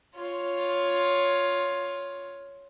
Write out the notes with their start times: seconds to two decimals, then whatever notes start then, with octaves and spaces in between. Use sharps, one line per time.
0.16 F4 C#5